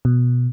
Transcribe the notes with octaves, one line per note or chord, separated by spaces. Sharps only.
B2